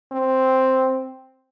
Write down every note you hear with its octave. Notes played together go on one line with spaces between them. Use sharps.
C4